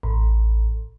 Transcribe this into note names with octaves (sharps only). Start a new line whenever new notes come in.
A1